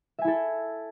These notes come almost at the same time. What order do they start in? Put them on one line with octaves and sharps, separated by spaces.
E5 G#5 E4 A4